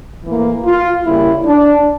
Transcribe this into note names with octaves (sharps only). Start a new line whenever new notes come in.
A2 E3 A#3
F4
C#3 G3 A#3 E4
D4